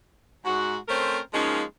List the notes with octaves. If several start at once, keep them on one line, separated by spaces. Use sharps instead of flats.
G#2 F#4
A3 C4 C#4 A#4 C5
F3 G#3 A#3 C#4 D#4